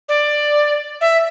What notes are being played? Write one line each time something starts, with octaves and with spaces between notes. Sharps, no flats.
D5
E5